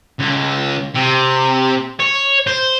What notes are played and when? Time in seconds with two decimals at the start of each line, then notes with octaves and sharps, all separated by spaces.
0.20 C#2
0.95 C3
2.00 C#5
2.47 C5